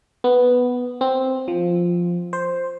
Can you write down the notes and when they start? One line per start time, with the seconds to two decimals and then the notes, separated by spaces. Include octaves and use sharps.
0.24 B3
1.01 C4
1.48 F3
2.33 C5